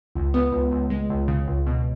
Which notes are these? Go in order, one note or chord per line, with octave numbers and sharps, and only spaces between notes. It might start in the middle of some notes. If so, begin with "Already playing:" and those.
C#2
B3
C#2
C#2
G#3
C#2
C#3
C#2
B2